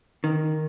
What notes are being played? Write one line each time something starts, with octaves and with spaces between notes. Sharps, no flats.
D#3